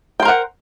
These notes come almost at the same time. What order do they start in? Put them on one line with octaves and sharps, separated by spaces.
G5 C5 A#4 F#5